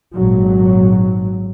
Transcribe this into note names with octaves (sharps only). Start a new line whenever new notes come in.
G#1 A#2 F#3